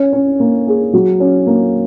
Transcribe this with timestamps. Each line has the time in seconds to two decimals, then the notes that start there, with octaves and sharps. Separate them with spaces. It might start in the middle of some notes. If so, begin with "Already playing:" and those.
Already playing: C#4
0.13 C#4
0.40 A#3
0.67 G#4
0.93 F#3
1.20 C#4
1.47 A#3